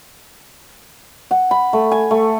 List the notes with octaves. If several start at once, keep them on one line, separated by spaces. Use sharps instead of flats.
F#5
B5
A3
G#5
A3